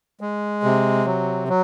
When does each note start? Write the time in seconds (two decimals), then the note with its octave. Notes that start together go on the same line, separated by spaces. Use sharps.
0.21 G#3
0.64 C3
1.06 F#3
1.48 F#3